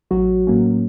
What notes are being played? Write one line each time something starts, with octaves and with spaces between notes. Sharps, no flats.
A1 F#3 F#4
A2 F#3 A#3 C#4